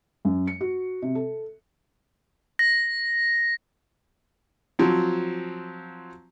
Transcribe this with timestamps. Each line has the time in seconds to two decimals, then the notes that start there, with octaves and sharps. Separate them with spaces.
0.25 F#2
0.47 C#7
0.61 F#4
1.02 C3
1.15 A4
2.59 A#6
4.79 F3 F#3 C4